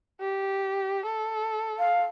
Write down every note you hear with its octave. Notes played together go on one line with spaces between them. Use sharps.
G4
A4
F5